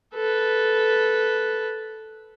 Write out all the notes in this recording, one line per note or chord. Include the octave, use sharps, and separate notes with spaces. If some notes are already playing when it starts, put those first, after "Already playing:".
A4 B4